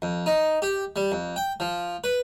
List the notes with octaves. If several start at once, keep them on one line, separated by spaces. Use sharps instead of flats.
F2
D#4
G4
G3
F2
G5
F3
B4